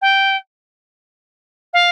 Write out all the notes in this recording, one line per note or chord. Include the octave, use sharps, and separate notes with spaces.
G5
F5